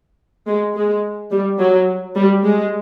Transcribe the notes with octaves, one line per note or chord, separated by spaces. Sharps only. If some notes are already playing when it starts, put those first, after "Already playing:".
G#3
G#3
G3
F#3
G3
G#3